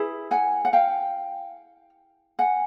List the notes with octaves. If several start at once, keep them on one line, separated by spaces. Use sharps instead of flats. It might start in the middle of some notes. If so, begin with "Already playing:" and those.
Already playing: E4 G#4 B4
F#5 G#5
F#5
F5 G5
F#5 G#5